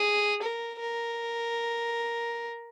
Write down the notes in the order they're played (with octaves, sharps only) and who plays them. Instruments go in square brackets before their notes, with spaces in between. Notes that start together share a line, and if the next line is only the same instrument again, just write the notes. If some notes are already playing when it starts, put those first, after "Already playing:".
Already playing: [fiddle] G#4
A#4
A#4